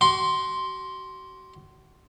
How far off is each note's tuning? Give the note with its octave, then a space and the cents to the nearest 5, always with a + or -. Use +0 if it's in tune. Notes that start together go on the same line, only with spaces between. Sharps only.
F#4 +40 C6 +0